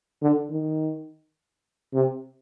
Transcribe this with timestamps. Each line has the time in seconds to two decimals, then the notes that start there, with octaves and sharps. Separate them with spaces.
0.22 D3
0.51 D#3
1.93 C3